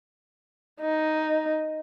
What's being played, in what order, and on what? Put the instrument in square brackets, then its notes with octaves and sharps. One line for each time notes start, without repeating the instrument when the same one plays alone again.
[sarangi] D#4